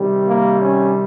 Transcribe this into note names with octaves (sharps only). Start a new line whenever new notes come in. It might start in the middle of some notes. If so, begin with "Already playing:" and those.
Already playing: C3 D#3 G3
A#3
C#4